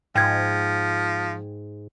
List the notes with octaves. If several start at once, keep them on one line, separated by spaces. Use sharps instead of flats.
G#2 F3 G5 G#6